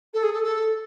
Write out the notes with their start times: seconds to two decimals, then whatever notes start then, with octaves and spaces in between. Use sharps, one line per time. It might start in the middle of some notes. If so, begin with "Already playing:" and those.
0.13 A4
0.23 G#4
0.33 A4
0.43 A4